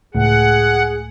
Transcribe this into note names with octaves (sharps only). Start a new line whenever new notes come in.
C#2 A2 G#4 F#5